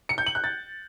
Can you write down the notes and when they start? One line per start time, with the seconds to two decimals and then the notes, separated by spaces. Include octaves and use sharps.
0.09 C#7
0.18 G6
0.26 F#7
0.35 F#6
0.44 A6